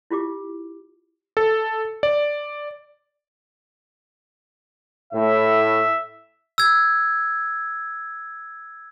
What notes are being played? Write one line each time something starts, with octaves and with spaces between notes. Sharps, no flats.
E4 F4 G4 D6
A4
D5
A2 E5
E6 G#6